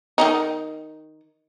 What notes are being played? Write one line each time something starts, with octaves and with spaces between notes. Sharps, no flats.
D#3 D4 D#4